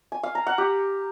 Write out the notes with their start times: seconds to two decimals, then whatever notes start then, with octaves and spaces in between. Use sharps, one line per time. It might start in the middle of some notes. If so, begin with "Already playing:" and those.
0.12 G#5
0.23 F5
0.35 A#5
0.47 F#5
0.58 G4